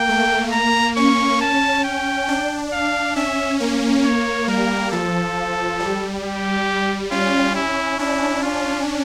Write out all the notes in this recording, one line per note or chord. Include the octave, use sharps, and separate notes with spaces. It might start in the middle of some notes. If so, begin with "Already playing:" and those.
Already playing: A#3 G5
A3
A#3 A#5
C#4 C#6
A5
G5
D4
F5
C#4 E5
A#3
C#5
G3 A#4
F3 A4
G3
G4
C#4 F4
E4
D4 E4
F4